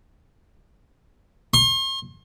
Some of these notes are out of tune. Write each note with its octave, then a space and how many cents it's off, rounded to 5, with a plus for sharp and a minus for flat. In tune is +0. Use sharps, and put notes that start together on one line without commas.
C6 +40